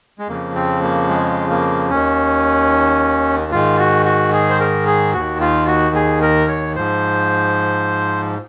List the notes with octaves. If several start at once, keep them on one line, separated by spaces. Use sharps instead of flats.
G#3
F2 C#3 F3 A#3
C4
A#3
G#3
A#3
D#2 D#3 C#4
G#2 D#3 F4
F#4
F#4
G#4
C5
A#4
G#4
D#2 D#3 F#4
F4
F#4
G#4
A#4
C#5
G#2 F3 C5